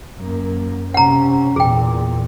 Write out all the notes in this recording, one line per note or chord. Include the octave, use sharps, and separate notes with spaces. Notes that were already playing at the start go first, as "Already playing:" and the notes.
F#2 A#3
C3 C#4 F#5 A#5
E2 A#2 G#4 G5